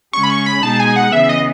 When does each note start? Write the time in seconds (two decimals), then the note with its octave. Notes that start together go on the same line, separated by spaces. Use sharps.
0.13 C#3 G#3 C#4 C#6
0.23 B5
0.30 C#6
0.46 B5
0.63 B2 G#3 D#4 G#4 A5
0.80 G#5
0.96 F#5
1.12 C#3 E3 B3 E5
1.29 D#5